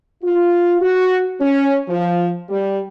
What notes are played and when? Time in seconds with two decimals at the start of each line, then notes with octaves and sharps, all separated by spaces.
0.24 F4
0.82 F#4
1.40 C#4
1.89 F3
2.49 G3